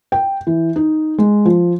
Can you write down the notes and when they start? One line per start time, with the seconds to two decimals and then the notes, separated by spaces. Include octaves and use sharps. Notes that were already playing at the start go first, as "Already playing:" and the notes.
0.12 G5
0.47 E3
0.76 D#4
1.18 G#3
1.45 F3